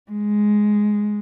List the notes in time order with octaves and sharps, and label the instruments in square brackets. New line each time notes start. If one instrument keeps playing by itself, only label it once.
[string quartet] G#3